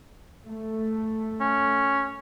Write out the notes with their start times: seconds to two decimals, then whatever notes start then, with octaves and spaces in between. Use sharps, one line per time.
0.47 A3
1.40 C#4